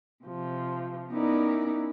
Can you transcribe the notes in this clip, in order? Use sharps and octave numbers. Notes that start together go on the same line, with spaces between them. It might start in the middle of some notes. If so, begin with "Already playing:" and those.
C3 F3
B3 C#4 D#4 E4 A#4 D5